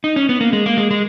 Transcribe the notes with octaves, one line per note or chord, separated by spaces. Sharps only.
D#4
C#4
B3
A#3
G#3
A#3
G#3
G#3